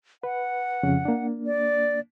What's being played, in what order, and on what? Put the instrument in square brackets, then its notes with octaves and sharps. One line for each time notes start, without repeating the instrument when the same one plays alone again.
[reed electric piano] B4 [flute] F#5
[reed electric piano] F2 C#3 C#4
A#3 D4
[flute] D5